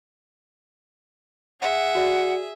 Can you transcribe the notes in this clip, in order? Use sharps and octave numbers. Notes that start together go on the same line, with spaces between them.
G#4 E5 F#5
F#4 D5